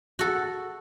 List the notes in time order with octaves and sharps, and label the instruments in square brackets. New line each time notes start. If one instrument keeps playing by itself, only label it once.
[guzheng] F#4 A4